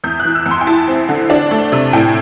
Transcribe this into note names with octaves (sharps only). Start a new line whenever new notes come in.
E2 G6
F#6
E3
E6
E2
C6
G5
E4 A5
C4
D3
D4
A3
C3
A2 G5